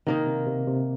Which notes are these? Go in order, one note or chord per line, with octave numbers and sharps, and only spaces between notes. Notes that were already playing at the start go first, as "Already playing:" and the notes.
C3 D#3 A#3 D#4
C3
C3
C3